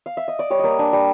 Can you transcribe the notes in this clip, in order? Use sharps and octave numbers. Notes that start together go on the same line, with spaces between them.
F5
E5
D#5
D5
G3 C#5
A#3 D5 D#5
D4 G#5
G3